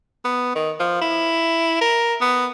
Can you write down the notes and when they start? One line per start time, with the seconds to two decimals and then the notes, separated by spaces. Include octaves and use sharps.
0.25 B3
0.55 D#3
0.80 F3
1.01 E4
1.81 A#4
2.21 B3